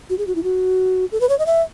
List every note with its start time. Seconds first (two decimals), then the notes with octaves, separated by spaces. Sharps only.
0.10 F#4
0.18 G#4
0.27 F#4
0.35 E4
0.44 F#4
1.12 A4
1.21 B4
1.29 C#5
1.39 D#5
1.46 E5